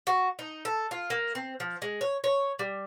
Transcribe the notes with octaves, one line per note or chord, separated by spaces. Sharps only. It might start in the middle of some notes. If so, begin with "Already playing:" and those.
F#4
D#4
A4
F4
A#3
C4
F3
G#3
C#5
C#5
G3